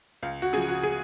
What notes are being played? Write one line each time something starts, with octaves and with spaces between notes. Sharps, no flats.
C#2 F5
F#4
C#3 F3 G#4
F#4
G#4